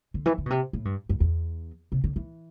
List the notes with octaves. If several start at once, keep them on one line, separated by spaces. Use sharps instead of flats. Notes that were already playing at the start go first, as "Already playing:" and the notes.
D3
E3
D3
B2
C3
A2
G2
F#2
E2
C3
D3
E3